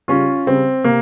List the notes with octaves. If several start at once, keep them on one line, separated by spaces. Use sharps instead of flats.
C#3 G3 C#4 F4
C#3 G3 C4
C3 A#3